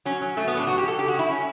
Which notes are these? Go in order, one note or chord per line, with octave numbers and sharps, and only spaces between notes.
F#3 C#4
F#3
F#3 A3
B3
A2
D4
F#3 F#4
G4
F#3 A4
C#3 G4
F#4
F#3
E4
G3 C#4